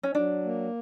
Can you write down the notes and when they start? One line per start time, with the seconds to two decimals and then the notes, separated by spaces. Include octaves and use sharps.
0.03 C#4
0.14 F#3 D4
0.45 A#3